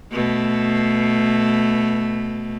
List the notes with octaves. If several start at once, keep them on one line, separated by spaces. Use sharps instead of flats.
B2 A3